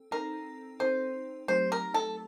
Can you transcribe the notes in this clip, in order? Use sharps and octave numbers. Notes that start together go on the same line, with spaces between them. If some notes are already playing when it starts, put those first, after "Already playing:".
Already playing: C4 A4
C4 D#4 A4 A#4
C4 D#4 A4 C5
F#3 A3 C4 D#4 G4 C5
A#4
A4